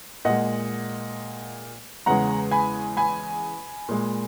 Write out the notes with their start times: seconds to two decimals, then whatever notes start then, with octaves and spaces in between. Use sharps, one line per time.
0.25 A#2 G#3 D#5 F#5
2.06 E2 C#3 G#3 F#5 A#5
2.51 G#5 B5
2.97 G#5 B5
3.89 A#2 G#3